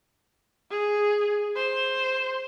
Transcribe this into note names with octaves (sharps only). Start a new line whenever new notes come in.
G#4
C5